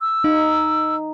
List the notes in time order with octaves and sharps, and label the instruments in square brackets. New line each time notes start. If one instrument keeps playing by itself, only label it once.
[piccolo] E6
[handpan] D#4